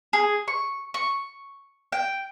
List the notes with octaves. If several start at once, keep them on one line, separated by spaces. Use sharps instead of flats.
G#4
C#6
C#6
G5